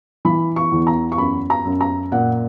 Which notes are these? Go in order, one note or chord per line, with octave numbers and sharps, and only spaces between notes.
E3 B5
C#6
E2
A#5
C#6
F#2 B5
A#5
F#2
A#5
A#2 F#5